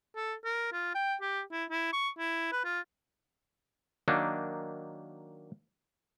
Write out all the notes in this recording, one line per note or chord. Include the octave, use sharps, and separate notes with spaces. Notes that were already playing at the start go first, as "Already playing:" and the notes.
A4
A#4
F4
G5
G4
E4
E4
C#6
E4
B4
F4
D#3 F#3 A#3 D4 D#4